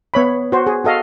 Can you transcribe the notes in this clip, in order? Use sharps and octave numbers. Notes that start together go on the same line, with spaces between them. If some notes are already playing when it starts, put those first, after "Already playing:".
B3 C#5 B5
F#4 C5
G#4
F#4 A4 D#5 F5